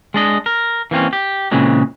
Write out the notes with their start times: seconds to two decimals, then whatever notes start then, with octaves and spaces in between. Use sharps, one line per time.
0.14 G#3 D4 D#5
0.46 A#4
0.91 E3 A#3 C4 C#4
1.13 G4
1.51 A#2 C#3 E3 G#3 C4